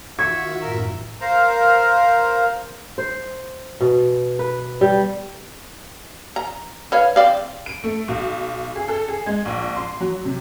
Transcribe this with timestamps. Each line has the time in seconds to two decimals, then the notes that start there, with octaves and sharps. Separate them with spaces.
0.19 D#3 F4 F#4 E5 C#6 G#6
0.62 F#2 A2 A#4 E5
1.21 A#4 C5 F5 A#5
2.98 C5
3.80 B2
4.39 B4
4.81 G3
6.36 A#5
6.92 B4 C#5 F5
7.16 C4 D5 F5
7.66 D7
7.84 A3
8.08 B1
8.76 G#4
8.88 A4
9.08 G#4
9.26 G#3
9.45 A#1
9.77 C6
10.00 F#3
10.25 C3